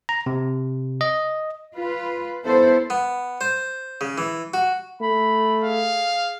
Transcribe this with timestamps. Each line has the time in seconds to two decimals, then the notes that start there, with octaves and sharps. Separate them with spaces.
0.09 A#5
0.26 C3
1.01 D#5
1.75 F4 B4
2.43 B3 E4 A4 C5
2.90 B3
3.41 C5
4.01 C#3
4.18 E3
4.54 F#4
5.01 A3 B5
5.64 G#4 F5